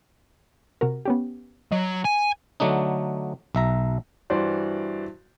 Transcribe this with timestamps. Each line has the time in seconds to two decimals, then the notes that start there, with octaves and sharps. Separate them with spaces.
0.81 C3 F#4 A#4
1.05 B3 C#4 G4
1.72 F#3 D#5
2.04 G#5
2.60 D3 F#3 A3 D4 D#4
3.55 B1 E5 A#5
4.30 G2 E3 F#4 C5 D5 C6